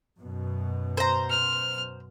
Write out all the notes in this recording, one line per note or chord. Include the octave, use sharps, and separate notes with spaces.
F#2 B2
C5 A#5
F6